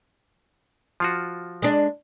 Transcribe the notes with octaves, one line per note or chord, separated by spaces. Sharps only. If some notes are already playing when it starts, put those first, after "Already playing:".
F3 F4 F#4
G#3 D4